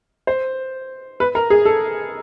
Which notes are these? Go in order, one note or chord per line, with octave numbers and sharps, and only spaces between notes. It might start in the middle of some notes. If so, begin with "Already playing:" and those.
C5
B4
A#4
G#4
A4